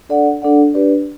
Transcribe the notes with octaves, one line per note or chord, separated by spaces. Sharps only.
D4 A4 D5 F#5
D4 A4 D5 F#5
D4 G4 B4 D5